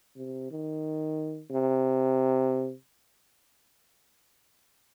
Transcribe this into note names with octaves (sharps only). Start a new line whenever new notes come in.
C3
D#3
C3